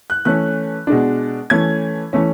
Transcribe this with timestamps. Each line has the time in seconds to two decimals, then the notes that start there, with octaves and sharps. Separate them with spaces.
0.10 F#6
0.25 E3 A3 C#4 F#6
0.87 B2 G#3 D4
1.50 E3 A3 C#4 G#6
2.13 E3 A3 C#4